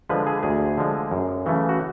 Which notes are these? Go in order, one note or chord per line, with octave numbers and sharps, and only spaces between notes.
D3 F3 G#3 B4
G#4
D2 G#4
D3 F3 G#3
F#2
C#3 E3 A3
F#4